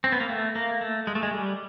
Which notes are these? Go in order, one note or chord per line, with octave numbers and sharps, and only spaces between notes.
C4
B3
A#3
A3
A#3
A3
G#3
A3
G#3
G3